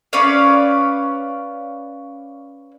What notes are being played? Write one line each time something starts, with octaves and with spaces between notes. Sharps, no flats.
C#4 B4 D5 F5